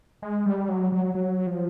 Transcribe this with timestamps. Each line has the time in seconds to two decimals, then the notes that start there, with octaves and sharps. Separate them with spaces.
0.22 G#3
0.46 G3
0.69 F#3
0.92 F#3
1.15 F#3
1.47 F3